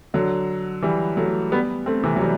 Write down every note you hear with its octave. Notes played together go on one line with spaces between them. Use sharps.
D3 F#3
E3 G3
F#3 A3
G3 B3
A3 C4
C3 E3
F#3
E3 G3